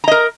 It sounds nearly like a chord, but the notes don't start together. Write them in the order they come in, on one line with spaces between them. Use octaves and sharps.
A#5 D#5 A#4